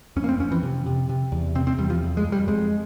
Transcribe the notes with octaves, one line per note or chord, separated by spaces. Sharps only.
F2 C#4
A#3
C4
F2 C#4
E3
C3
C3
C3
E2
C3 C4
C4
E2 G3
F3
F2
G#3
F2
G3
F2 G#3